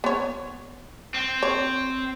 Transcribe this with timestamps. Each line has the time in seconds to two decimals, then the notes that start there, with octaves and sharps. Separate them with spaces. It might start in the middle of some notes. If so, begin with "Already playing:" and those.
0.04 B3 C#5
1.14 C4
1.43 C#5